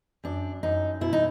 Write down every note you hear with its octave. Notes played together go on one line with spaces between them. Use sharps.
F#2 D4
F#2 D#4
B2 E4
D#4